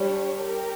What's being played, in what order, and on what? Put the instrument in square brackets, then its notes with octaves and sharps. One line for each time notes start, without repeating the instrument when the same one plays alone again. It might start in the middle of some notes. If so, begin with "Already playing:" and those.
Already playing: [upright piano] G3 [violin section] D4 G4 C#5
[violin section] G4 A#4